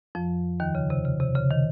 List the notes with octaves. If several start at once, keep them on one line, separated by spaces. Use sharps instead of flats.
F2 F3
D#2 D#3
C#3
C3
C#3
C3
C#3
D#3